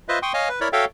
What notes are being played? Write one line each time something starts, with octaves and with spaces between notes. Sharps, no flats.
F4 B4 C5 D#5 E5
G5 C6 C#6 D#6
C#5 D#5 F5 G#5
B4
E4 A#4 C#5 D5 B5
F#4 A4 C#5 E5 F5 G5